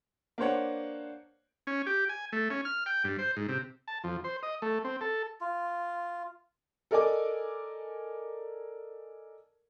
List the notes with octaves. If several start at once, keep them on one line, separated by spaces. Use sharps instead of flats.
A#3 D4 C5 C#5 F#5
C#4
G4
G#5
A3
C#4
F6
G5
G2
C5
G#2
C3
A5
F2
C5
D#5
A3
C4
A4
F4
A4 A#4 D5 D#5 G#5 D6